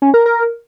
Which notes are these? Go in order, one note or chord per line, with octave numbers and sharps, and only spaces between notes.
C#4
A#4
A#4